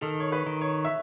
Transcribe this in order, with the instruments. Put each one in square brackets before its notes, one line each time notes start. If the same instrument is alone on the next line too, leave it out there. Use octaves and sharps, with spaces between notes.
[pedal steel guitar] D#3 [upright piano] A4
[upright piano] C#5
B4
[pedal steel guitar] D#3
[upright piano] C#5
E5